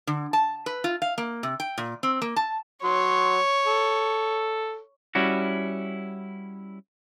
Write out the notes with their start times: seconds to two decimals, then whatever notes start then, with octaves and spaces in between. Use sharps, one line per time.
0.07 D3
0.33 A5
0.66 B4
0.84 F4
1.02 F5
1.18 A#3
1.43 C3
1.60 G5
1.78 A#2
2.03 C4
2.22 A#3
2.36 A5
2.84 F#3 C#5 C6
3.66 A4
5.15 G3 C#4 E4 F#4